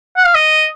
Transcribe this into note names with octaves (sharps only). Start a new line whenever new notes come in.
F#5
F5
D#5